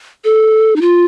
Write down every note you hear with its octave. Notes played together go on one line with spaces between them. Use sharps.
A4
D#4
F4